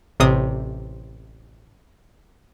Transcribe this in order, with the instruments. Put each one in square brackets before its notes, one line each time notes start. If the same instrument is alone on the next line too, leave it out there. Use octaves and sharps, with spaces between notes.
[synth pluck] A1 C3 D#6